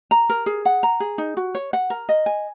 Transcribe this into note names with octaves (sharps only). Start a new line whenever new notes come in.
A#5
A#4
G#4
F#5
A#5
G#4
D#4
F#4
C#5
F#5
A#4
D#5
G#5